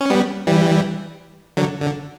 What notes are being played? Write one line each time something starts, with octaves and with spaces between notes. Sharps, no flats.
C#4
G3 B3
E3 G3
D3 F#3
D3